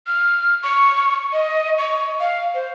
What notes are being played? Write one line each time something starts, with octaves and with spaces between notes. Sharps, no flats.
F6
C#6
D#5
C#6
F5
C5